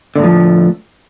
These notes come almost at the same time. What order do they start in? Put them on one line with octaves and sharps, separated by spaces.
D3 A2 F3